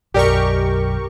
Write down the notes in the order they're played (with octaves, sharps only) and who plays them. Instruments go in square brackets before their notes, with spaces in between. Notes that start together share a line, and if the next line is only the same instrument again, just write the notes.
[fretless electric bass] B1 F#2 [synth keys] G4 A#4 C#6 [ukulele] G#4 D5 D#5